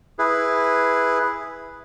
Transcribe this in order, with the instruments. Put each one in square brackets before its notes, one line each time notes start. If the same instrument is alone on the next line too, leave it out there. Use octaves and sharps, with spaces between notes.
[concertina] E4 G#4 B4